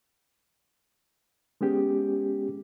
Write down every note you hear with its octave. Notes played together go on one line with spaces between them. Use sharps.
G#3 B3 C#4 G4 G#4